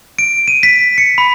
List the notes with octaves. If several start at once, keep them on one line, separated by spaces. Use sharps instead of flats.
D7
D#7
B6
C#7
B5